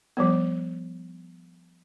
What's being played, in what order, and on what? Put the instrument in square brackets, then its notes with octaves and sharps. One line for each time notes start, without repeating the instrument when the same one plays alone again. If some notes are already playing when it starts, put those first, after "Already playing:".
[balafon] F3 G3 B3